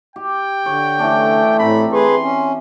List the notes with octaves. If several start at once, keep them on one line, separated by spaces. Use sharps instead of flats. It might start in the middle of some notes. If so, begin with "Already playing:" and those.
G4 G5
D3 C#5
E3 A3 C#4 D4
A2 C4 A#5 B5
G#4 B4 C6
C#4